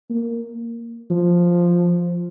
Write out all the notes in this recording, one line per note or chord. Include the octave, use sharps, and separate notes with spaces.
A#3
F3